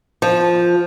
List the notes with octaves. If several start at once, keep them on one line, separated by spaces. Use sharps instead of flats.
F3